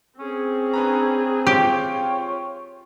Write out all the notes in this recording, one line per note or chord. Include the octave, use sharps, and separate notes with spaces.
C4 C#4 G#4
D4 B4 A#5
F4 G4 C#5 G5